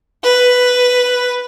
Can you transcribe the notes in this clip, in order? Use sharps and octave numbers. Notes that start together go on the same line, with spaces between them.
B4